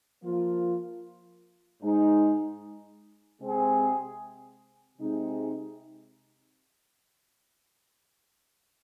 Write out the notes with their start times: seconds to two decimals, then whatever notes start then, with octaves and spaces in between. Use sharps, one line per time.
0.22 F3 A#3 F4
1.82 G#2 G#3 D#4
3.40 C3 G#3 C4 G#4
4.98 C3 G#3 D#4